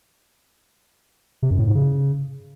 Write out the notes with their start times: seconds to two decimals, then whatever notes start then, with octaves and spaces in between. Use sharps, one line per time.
1.42 C3
1.51 F#2
1.59 A2
1.67 G#2
1.75 C#3